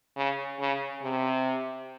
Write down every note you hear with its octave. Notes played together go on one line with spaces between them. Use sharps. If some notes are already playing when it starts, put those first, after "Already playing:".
C#3
C#3
C3